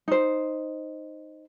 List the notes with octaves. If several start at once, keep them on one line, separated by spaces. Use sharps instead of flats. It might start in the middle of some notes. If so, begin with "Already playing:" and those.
D#4 C5